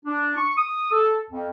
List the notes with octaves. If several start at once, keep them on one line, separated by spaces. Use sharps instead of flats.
D4
C#6
D#6
A4
F2